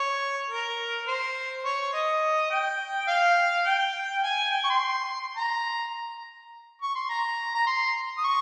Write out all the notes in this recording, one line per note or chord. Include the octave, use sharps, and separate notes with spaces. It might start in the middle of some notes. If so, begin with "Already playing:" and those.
Already playing: C#5
A#4
C5
C#5
D#5
G5
F5
G5
G#5
G5
C#6
C6
A#5
C#6
C6
A#5
A#5
C6
D#6
C#6